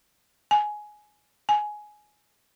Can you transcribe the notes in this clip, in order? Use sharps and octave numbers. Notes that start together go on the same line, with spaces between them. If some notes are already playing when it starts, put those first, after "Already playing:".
G#5
G#5